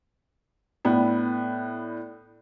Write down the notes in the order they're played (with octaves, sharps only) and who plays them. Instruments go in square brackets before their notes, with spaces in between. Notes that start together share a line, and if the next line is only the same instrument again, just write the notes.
[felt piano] A2 B3 D4